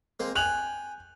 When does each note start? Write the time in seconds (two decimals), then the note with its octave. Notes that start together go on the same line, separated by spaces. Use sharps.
0.20 G#3 A#3 C4
0.35 G5 G#5 F#6 F7 F#7